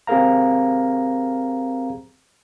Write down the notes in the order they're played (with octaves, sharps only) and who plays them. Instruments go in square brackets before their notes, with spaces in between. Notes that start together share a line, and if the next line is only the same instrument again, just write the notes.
[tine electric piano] C4 G4 G#4 A#4 F5 A#5